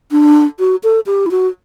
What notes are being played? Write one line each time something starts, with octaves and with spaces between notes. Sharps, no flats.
D4
F#4
A4
G4
E4
F#4